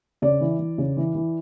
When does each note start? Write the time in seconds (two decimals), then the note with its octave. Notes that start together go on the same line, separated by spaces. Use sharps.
0.22 C#3 D5
0.41 E3
0.59 E3
0.78 C#3
0.97 E3
1.15 E3